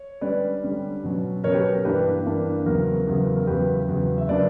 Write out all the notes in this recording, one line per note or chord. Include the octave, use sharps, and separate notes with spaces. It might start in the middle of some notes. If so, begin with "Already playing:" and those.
Already playing: C#5
D3 G3 C#4 B4 D5
D3 G3 C#4
B2 F#3 C#4
B2 F#3 C#4 A#4 C#5
G4 B4
A#4
A#4
G2 E3 A#3 D4 G4 B4
G2 E3 A#3 D4
E2 C#3 F#3 B3 A#4
E2 C#3 F#3 B3
A#4
E2 C#3 F#3 G4 B4
E2 C#3 F#3
E5
C#3 F#3 A#3 D4 B4 D5